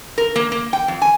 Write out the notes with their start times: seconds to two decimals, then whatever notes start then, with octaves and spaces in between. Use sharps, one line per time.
0.18 A#4
0.36 A#3
0.52 A#3
0.73 G5
0.88 F2
1.02 G#5